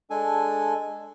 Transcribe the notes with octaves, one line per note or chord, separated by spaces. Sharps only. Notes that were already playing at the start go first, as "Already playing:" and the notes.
G#3 D4 A4 G#5